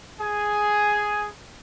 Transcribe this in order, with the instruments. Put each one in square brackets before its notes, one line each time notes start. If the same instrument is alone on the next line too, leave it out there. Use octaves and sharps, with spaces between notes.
[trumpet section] G#4 G#5